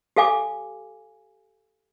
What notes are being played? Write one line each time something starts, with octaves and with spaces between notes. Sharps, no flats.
G4 A4 F5 G#5 D6